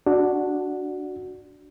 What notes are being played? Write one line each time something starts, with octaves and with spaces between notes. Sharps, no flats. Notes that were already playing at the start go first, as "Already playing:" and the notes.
D4 F#4